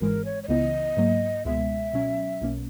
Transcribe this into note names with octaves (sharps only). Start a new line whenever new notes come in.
G#1 G#2 E3 G#3 A#4
C#5
C#5
C#2 C#3 E3 B3 E4 D#5
G#2 F#3 A#3
C#2 B2 G#3 B3 E5
B2 F#3 C#4
B1 B2 A#3 C#4